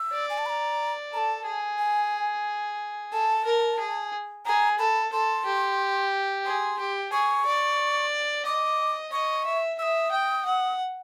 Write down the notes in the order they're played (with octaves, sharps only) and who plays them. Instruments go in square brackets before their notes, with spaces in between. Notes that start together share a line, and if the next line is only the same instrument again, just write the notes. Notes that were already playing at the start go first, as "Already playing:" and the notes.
Already playing: [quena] E6
[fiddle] D5
[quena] G#5
A5
B5
A#5
[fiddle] A4 [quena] A#5
[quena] A5
[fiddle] G#4
[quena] G#5
[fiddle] A4 [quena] A5
[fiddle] A#4
G#4
[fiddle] G#4 [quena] A#5
[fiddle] A4 [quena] B5
[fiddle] A4 [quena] C6
[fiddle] G4
[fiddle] G#4 [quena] C6
[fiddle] G4
[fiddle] G#4 [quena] C#6
[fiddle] D5
[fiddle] D#5 [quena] D6
[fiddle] D#5 [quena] C#6
[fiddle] E5
[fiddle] E5 [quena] D#6 E6
[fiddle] G5
F#5